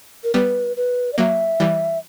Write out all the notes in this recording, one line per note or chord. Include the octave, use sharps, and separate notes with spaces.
A#4
G3 B3 B4
B4
D5
F#3 A#3 E5
E3 G3